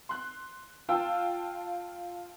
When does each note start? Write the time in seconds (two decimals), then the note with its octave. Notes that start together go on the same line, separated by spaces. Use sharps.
0.09 C6 F#6
0.89 F4 F5 G5 A5 E6